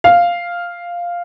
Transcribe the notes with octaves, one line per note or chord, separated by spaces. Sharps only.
F5